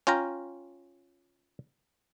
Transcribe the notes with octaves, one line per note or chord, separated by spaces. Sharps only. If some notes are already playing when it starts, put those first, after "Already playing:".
C#4 F4 G5 A#5